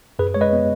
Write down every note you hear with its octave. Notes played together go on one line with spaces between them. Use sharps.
F#2 G#4 B4
G#3 C#5
B4 D#5
B3